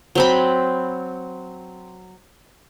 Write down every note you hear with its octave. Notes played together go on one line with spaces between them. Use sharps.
F#3 C4 B5